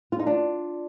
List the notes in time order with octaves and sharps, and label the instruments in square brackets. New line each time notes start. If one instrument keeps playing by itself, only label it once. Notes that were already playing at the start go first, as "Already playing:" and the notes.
[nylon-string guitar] F4
D#4
D4 F4